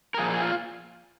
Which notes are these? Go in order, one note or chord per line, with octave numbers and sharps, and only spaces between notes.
A#4
A#2 F3 A#3 G#4
G#4
F4